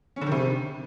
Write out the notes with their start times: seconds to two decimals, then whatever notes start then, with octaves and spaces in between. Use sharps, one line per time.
0.16 C#4
0.21 D3
0.26 D#3
0.32 C3